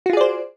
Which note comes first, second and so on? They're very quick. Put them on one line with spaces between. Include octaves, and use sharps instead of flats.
F#4 F4 G#4 D5 C5